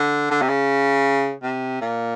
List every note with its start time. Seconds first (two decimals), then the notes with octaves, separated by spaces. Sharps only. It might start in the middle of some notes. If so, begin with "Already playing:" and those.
Already playing: D3
0.31 D3
0.42 C3
0.49 C#3
1.43 C3
1.81 A#2